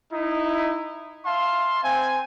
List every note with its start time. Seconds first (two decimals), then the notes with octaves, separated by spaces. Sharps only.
0.13 D#4 E4
1.26 E5 F5 A5 C6
1.84 C4 G#5